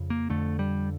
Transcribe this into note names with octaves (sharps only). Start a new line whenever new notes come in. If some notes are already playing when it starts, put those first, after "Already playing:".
Already playing: F2 C#3
A#3
F2 D3 A3
G3